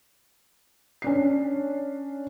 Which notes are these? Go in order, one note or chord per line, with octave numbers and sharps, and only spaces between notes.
C#4 D4 C7